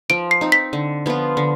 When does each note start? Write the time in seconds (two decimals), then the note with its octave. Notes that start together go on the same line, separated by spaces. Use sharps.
0.10 F3 D7
0.31 C7
0.41 C4 D#4
0.52 B6
0.73 D3
1.06 F3 B3 F4
1.37 D3